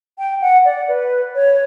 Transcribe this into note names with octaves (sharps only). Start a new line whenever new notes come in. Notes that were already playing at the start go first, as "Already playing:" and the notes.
G5
F#5
D5
B4
C#5